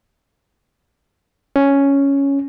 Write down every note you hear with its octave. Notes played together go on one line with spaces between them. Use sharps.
C#4